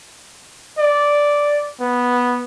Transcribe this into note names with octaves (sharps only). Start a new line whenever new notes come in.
D5
B3